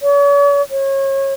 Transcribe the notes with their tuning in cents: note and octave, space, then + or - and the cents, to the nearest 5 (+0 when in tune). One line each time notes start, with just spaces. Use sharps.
C#5 +45
C#5 -30